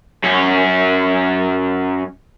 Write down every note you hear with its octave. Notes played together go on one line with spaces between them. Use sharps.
F#2 C#4